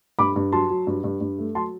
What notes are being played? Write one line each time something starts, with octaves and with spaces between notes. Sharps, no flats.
G2 B5 D6
G2
F#3 A5 C6
F#3
G2
G2
G2
A3
F#3 A5 C6